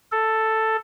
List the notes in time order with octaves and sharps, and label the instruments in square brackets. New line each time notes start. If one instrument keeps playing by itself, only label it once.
[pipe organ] A4